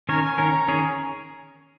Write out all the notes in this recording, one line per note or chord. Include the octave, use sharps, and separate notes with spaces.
D#3 C#4 A#4 C#5 G#5
G#5
D#3 C#4 A#4 C#5 A#5
D#3 C#4 G#4 C#5